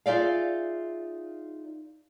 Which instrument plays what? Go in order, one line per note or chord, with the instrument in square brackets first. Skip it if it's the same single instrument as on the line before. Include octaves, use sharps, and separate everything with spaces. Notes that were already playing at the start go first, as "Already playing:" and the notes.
[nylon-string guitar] D#4 F4 G#4 D5 E5 F5